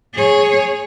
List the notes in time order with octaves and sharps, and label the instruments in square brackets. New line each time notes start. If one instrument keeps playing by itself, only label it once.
[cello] G#4 C#5